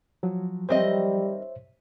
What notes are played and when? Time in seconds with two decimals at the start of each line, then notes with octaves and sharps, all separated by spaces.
0.23 F3 F#3
0.69 D#3 G3 C4 C5 C#5 D#5 E5